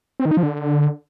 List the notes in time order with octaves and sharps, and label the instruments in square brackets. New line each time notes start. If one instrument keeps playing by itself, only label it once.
[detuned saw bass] C4
D#3
D#4
F3
D3